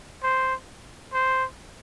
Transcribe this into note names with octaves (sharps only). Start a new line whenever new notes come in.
C5
C5